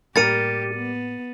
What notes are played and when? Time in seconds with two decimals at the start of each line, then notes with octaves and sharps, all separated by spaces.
0.16 A2 G3 A#3 G4 A#4 A6 C#7 D#7
0.74 B3